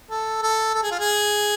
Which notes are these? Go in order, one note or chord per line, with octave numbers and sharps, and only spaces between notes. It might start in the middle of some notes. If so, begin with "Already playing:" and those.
A4
A4
A4
G#4
F4
G#4